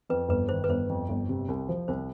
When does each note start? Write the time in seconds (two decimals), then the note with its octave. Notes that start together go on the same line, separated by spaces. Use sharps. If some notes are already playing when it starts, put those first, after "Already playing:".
0.09 F2 B4
0.29 G1 B4
0.49 D#3 C5
0.64 B4
0.69 G1 C5
0.89 F2
1.09 G1
1.29 C3
1.48 C2
1.69 F3
1.88 C2 C5